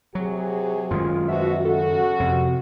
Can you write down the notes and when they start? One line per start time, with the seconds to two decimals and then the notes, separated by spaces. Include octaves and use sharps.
0.15 C3 F#3 F#4 G#4
0.91 F#2 D#3 G#3 F4
1.28 B2 F3 F#4 E5
1.65 C#3 F#4 A4
2.20 F2 C3